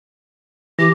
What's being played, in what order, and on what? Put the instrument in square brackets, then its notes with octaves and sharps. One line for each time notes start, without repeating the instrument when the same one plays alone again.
[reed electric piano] E3 [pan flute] G4 [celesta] A#6